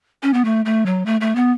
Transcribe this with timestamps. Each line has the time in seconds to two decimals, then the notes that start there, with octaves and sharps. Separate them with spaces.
0.23 C#4
0.33 B3
0.45 A3
0.65 A3
0.86 F#3
1.06 A3
1.21 A3
1.35 B3